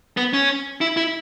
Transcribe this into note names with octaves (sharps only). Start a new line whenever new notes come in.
B3
C#4
E4
E4